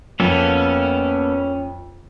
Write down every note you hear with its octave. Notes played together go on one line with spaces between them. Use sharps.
F2 A#3 B3 C#4 A4